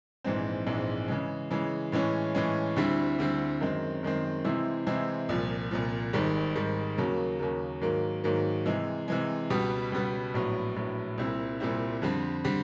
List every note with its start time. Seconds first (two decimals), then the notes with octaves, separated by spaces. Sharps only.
0.24 A#1 G#2 E3 G#3 C4
0.66 A#1 G#2 E3 G#3 C4
1.08 C#3 E3 G#3
1.51 C#3 E3 G#3
1.92 A2 E3 G#3 C#4
2.35 A2 E3 G#3 C#4
2.76 D2 D3 G3 C4 E4
3.19 D2 D3 G3 C4 E4
3.61 F#2 D#3 G#3 C4
4.03 F#2 D#3 G#3 C4
4.45 C3 E3 G#3 C4 E4
4.87 C3 E3 G#3 C4 E4
5.29 C2 A#2 F3
5.71 C2 A#2 F3
6.13 G#1 G#2 D#3 G3
6.55 G#1 G#2 D#3 G3
6.97 D#2 C#3 F#3 A#3
7.39 D#2 C#3 F#3 A#3
7.81 G#2 D#3 F#3 A#3
8.24 G#2 D#3 F#3 A#3
8.66 C3 E3 G#3
9.08 C3 E3 G#3
9.50 C#2 B2 G3 B3
9.92 C#2 B2 G3 B3
10.34 A#1 A2 F#3 B3
10.76 A#1 A2 F#3 B3
11.18 C2 A#2 G3 C4 E4
11.60 C2 A#2 G3 C4 E4
12.02 F2 D3 G3 C4
12.44 D3 G3 C4